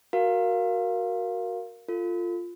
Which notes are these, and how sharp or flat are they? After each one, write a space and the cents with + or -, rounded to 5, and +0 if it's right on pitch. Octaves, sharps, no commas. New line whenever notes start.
F#4 +0 A#4 +0 F5 +0
F4 +0 A4 +25